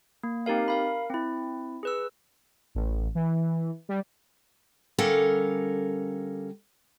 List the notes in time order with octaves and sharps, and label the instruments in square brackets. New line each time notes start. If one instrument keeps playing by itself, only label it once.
[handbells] A#3
C4 D#4 G4 A#4 F5
A#4 F5 B5
C4 E4
G#4 B4 E6
[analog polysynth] A1
E3
G3
[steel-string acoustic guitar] D3 G3 C#4 A4 A#4 F5